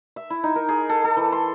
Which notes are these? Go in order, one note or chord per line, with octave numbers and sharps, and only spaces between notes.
E5
E4
D#4
A#4
G#4
A4
A4
E3
C6